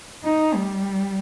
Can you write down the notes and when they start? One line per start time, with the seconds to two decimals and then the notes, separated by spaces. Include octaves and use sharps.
0.24 D#4
0.54 G3